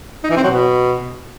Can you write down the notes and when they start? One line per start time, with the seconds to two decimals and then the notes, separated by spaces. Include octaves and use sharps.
0.24 D#4
0.30 E3
0.37 C4
0.43 F#3
0.50 B2